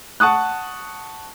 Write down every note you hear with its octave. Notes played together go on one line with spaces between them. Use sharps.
F#5 A5 C#6 D#6 F#6